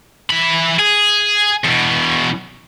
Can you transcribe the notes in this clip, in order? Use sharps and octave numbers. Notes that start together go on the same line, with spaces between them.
E3 B5
G#4
E2 B2